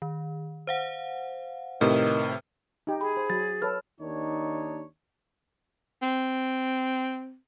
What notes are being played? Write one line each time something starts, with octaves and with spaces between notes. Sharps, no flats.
D#3
C5 F5 F#5
A2 C3 D#3 B4 F6
D#4 G4
G#4 B5
C5
F#3 A6
A4 B4 C#5 F6
D#2 D#3 D4 D#4 C#5
C4